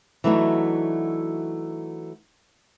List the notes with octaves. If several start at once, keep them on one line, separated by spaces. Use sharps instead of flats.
E3 F#3 A3 D4 D#4 F#4